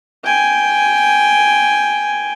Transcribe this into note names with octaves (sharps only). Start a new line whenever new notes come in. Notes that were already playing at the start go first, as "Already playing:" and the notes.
G5 G#5